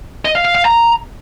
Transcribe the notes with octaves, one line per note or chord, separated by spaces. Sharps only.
D#5
F5
F5
F5
A#5